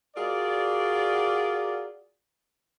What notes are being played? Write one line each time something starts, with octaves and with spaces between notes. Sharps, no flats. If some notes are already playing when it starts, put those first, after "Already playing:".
F4 F#4 G#4 A#4 D5